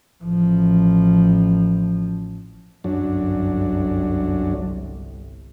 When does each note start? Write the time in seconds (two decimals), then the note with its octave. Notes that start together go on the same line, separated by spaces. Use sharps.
0.23 A1 F3
2.84 G1 C2 F#2 F#3 D4